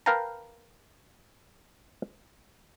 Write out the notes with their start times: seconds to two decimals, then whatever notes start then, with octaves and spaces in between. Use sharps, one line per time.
0.06 A#4 B4 F5 G5 A5 A#5